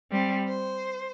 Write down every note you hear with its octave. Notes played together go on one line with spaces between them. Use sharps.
G3 C4
C5